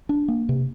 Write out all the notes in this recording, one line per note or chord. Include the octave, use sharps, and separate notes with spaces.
D4
A#3
C3